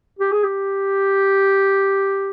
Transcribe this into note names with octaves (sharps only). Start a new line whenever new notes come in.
G4
G#4
G4